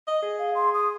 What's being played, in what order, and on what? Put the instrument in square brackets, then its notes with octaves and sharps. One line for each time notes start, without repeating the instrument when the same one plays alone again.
[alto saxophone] D#5
G#4
[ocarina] F5
C6
D#6